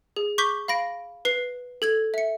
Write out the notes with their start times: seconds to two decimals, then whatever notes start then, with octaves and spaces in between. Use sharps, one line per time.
0.16 G#4
0.38 C#6 D6 G6 B6 G7
0.68 F5 B5 A#6 D7
1.25 B4 C7
1.82 A4 G#6 F#7
2.14 E5 C#7